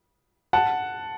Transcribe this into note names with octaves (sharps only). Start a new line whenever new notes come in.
F#5 A5